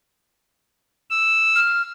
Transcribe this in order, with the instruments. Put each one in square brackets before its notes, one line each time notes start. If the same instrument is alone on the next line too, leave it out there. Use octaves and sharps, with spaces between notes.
[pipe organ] E6
[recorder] F6